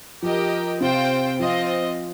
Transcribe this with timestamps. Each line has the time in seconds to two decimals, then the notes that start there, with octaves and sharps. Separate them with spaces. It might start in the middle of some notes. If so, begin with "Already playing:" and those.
0.22 F3 G4 A#4 D#5 G5
0.81 C3 C4 F4 C5 G5
1.39 F3 C4 F4 D#5